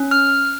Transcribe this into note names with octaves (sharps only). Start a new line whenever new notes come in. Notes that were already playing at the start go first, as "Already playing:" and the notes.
Already playing: C#4
F6